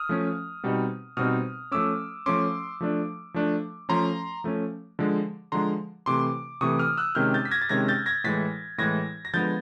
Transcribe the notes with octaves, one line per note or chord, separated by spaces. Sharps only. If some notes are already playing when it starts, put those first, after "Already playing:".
Already playing: D#6 F6
F3 A3 C#4
B2 G3 C4 D#4
B2 G3 C4 D#4 D#6 F6
F3 A3 C#4 D6 E6
F3 A3 C#4 C6 D6
F3 A3 D4
F3 A3 D4
F3 A3 C#4 A#5 C6
F3 A3 C#4
D3 F3 G#3
D3 F3 G#3 A#5 C6
C3 E3 A3 C6 D6
C3 E3 A3 C#6 D#6
D#6 F6
E6 F#6
C3 D#3 G#3 C#4 F6 G6
G6 A6
B6
G#6 A#6
A6
C3 D#3 G#3 C#4 G#6 A#6
G6 A6
G#6 A#6
A2 E3 G#3 A6 B6
A2 E3 G#3 G#6 A#6
A#6
D3 F3 G#3 B3 G6 A6